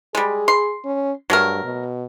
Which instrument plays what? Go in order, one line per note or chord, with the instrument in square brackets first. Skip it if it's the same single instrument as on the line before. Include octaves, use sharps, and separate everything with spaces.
[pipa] G3 G#3 [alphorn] G#4
[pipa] C6
[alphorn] C#4
[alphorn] G2 [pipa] F#3 A3 A#4
[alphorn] B2